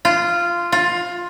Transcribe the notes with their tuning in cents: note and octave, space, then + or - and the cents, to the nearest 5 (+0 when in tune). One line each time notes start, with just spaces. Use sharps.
F4 -10
F4 +15